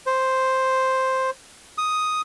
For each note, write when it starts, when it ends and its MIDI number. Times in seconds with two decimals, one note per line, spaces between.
0.06 1.30 72
1.78 2.21 87